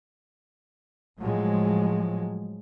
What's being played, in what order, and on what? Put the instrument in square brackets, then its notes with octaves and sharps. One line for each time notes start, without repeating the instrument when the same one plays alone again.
[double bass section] A2 F3 F#3 G#3